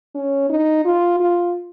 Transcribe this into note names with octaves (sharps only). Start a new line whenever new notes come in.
C#4
D#4
F4
F4